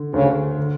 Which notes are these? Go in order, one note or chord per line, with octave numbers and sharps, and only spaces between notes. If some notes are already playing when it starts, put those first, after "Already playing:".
Already playing: D3
D2 C#3
D3